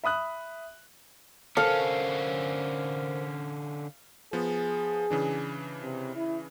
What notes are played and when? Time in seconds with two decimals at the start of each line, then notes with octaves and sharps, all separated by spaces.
0.04 E5 B5 D#6 F#6
1.57 D3 C#4 A4 A#4 C5 F5
4.33 F3 B3 G#4
5.10 C#3 E3 D4
5.83 C3
6.16 E4